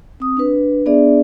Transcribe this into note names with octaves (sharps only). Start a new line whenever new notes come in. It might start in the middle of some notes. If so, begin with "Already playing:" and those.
C4 D#6
D4 B4
B3 D4 G#4 D5 E5